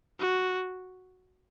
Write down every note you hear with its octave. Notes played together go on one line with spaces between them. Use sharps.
F#4